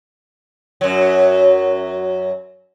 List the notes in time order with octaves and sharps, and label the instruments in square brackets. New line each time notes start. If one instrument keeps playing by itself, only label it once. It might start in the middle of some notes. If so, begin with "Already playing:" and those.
[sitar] F#2 F#3